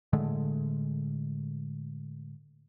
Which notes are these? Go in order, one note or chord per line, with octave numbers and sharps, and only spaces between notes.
A2 D3 G#3 A3